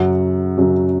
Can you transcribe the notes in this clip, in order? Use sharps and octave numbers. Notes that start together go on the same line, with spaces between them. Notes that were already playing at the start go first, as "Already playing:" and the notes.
Already playing: F#2 C#3 F#3 F#5
F#2 C#3 F#3